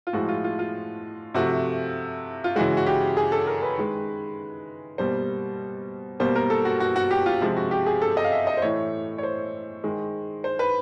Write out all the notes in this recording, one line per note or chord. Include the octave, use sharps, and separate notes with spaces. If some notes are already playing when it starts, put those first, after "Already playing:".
F4
A2 F3 G#3 F#4
F4
F4
F4
C3 F3 A3 F#4
F4
C#3 E3 G#3 F#4
F#4
G4
G#4
A4
A#4
B4
D#3 G#3
B2 G3 A#3 C5
B2 G3 A#3 C5
A#4
A4
F#4
F#4
F#4
G4
F4
C3 F3 G#3
F#4
G4
G#4
A4
D#5
F5
E5
D#5
C5
A2 E3 A3 C#5
C#5
C5
D#3 G#3
C5
B4